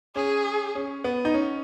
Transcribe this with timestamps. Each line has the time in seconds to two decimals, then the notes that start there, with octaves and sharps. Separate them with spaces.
0.16 C#4 G#4
0.75 C#4
1.04 B3
1.25 D#4
1.34 C#4